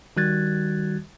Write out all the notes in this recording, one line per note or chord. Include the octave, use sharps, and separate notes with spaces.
D#3 G3 F#4 F#6 G#6 A6